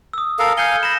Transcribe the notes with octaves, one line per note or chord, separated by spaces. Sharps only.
D#6 E6
A4 A#4 F5
F5 G#5 G6 C#7 G7
B5 A#6 E7